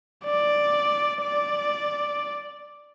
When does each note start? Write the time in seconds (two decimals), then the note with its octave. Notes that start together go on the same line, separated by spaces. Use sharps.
0.25 D5
1.21 D5